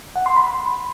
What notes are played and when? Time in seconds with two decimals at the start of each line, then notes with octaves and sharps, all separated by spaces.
0.16 F#5
0.26 C6
0.36 B5